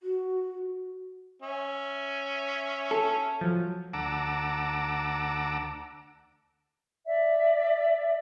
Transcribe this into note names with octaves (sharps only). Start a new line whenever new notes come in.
F#4
C#4 E5
A4
F3 F#3
D2 F#5 A5 A#5 D6 E6
D5 E5